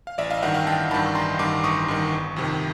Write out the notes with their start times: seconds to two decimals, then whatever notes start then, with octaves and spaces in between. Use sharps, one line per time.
0.07 F5
0.18 A1 D5 E5
0.30 D#5 F5
0.43 G2 D#3 E5 F#5
0.54 F5 G5
0.67 A1 G5 A5
0.91 G2 D#3 A5 B5
1.15 A1 A#5 C6
1.39 G2 D#3 C6 D6
1.63 A1 C#6 D#6
1.88 G2 D#3
2.12 G1
2.36 F2 C3 D#3